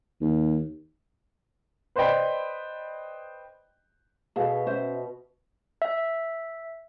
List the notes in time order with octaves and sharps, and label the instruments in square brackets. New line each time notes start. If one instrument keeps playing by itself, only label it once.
[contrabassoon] D#2
[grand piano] B4 C5 D5 D#5 G5 B5
[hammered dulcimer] B2 [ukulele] G#4 A4 F5
[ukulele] C#4 C5 E5
[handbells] E5